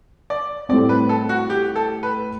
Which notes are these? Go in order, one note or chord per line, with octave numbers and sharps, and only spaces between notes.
D5
A2 G3 C4 D5
B4
A4
F#4
G4
A4
B4